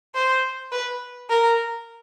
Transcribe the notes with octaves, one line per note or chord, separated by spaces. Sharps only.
C5
B4
A#4